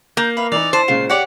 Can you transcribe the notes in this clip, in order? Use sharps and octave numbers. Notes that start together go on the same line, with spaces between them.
A#3 G6
B4 E5 F5
E3 D#4 D5 F7
E4 C5 A5
A#2 C#3 G#3 F4 C7
G4 C#5 D5 F#5 C#7